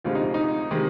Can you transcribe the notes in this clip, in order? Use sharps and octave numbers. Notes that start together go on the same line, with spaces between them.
D2 C3 F3 G#3 F4
D#4
D#4
C3 D#3 G#3